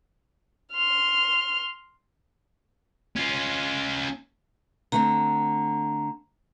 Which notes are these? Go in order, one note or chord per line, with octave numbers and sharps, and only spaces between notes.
C6 F6
C#4 F4
D3 A3 C4 A#5